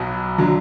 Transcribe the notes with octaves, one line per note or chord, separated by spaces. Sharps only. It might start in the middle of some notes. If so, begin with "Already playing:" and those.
Already playing: B1 B2 F#3
D3 F#3